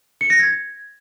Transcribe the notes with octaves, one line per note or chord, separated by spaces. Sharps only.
C#7
A#6
G#6